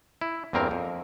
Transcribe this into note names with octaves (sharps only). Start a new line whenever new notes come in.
E4
E2 G2 A#3 C4 A#4
F2